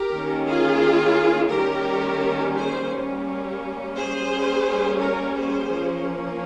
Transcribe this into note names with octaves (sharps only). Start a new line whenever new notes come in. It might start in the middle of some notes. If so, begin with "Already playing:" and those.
Already playing: G4 A#4
D#3 A#3 C#4
F4 G#4
D#3 G3 A#3 C#4 G4 A#4
G#4 C5
G3 A#3 C#4
G#4 C5
G3 A#3 C#4
A#4 C#5
G#4 C5
F3 A#3 C#4